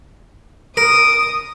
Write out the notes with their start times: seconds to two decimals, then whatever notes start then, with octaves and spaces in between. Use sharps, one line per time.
0.77 A#4 D#6